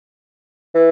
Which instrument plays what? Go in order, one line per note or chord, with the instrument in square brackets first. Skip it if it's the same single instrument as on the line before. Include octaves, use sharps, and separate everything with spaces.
[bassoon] E3